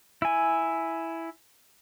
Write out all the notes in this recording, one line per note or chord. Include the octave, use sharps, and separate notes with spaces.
E4 G#5